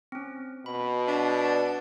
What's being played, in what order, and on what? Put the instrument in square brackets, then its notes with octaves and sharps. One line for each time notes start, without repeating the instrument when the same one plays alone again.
[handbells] C4 C#4
[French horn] B2 [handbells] B5
[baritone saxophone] D4 [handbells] E5
[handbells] B4 D5